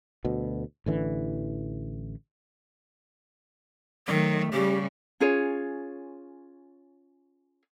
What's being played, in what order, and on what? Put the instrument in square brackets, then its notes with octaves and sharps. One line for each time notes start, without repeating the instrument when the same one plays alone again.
[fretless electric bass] D2 B2
A1 D3 E3
[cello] D#3 A3 [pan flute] F#3
[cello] C#3 G3 [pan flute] G4
[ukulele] C#4 F4 G#4 C#5